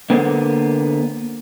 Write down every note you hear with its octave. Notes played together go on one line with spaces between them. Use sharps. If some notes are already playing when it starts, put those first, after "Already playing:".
D3 A#3 B3 C5